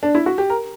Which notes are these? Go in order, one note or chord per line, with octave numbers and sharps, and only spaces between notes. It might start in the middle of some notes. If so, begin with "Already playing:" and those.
D4
E4
F#4
G4
A#4